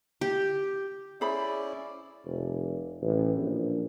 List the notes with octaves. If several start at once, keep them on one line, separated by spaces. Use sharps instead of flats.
G4
C#4 E4 G#4 C5 D5 B5
F1
A1
A#1